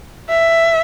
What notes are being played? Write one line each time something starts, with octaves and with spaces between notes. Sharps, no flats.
E5